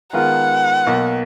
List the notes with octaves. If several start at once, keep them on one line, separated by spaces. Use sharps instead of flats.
D#3 G#3 B3 F4 A#4 F#5
B1 B2 A#3